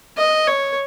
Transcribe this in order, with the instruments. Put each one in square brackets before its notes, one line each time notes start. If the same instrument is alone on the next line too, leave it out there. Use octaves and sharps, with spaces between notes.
[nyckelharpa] D#5
C#5